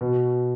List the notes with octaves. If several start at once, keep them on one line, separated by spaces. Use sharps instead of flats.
B2